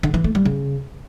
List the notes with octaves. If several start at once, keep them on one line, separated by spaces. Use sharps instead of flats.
D3
E3
A3
G3
C#3